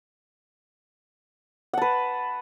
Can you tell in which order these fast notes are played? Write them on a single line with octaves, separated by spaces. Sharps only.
F#5 A5 B4